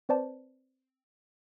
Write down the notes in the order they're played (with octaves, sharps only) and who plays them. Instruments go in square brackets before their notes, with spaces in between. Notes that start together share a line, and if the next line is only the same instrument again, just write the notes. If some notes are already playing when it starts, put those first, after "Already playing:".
[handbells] C4 B4 C5 D5 A5